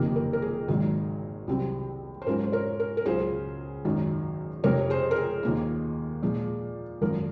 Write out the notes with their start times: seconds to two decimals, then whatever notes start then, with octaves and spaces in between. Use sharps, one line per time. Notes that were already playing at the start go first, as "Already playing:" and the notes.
Already playing: F#1 F2 C3 D#3 A#3 A#4
0.16 A#4
0.33 A#4
0.42 G#4
0.68 G#1 G#2 D#3 F#3
1.47 C2 C3 F#3 C4
2.22 C5
2.27 G#2 F#3 C#4 F4 A#4
2.44 C5
2.52 A#4 C#5
2.80 A#4
2.97 A#4
3.05 C#2 C#3 F#3 C#4 F4 G#4 C5
3.85 G#1 F#2 D#3 F#3
4.64 F1 F2 C3 A#4 C#5
4.90 G#4 C5
5.11 A#4
5.16 G#4
5.43 D#2 D#3 A#3 F4
6.22 A#2 F3 G#3
7.01 G#1 F#2 F3 A#4